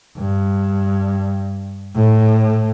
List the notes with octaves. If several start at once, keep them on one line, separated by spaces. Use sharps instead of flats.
G2
A2